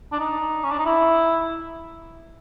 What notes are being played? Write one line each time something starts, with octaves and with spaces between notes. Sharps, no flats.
D4
D#4
C#4
D4
D#4
E4